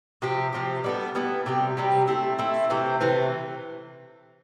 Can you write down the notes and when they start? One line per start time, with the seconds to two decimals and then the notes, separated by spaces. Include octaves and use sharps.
0.22 C3 F3 C4 G4
0.53 C3 F3 C4 G4
0.84 G3 B3 E4 A4
1.15 G3 B3 E4 A4
1.46 C3 G3 C4 G4
1.77 C3 G3 C4 G4
2.08 A3 C4 E4
2.39 A3 C4 E4
2.70 C3 E3 A3 C4
3.01 C3 E3 A3 C4